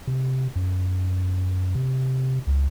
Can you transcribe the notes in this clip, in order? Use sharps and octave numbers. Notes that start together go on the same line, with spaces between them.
C3
F#2
C3
C#2